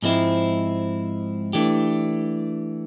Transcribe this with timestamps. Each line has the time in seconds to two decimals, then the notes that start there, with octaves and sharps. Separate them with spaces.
0.02 G#2 F3 G#3 C4 E4
1.53 E3 A3 D4 G4